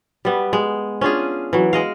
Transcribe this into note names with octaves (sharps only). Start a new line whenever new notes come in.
G3 B3
G#3
C#4 D4 F4 G#4
E3 F#3
G#3 D#5 F5